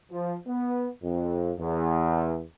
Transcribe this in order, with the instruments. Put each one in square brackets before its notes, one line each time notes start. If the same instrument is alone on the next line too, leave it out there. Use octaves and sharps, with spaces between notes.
[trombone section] F3
B3
F2
E2